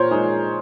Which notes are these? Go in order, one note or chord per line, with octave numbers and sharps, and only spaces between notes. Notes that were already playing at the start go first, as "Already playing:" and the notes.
Already playing: A#2 A#4 C5 C#5
G#3 D#4 G#4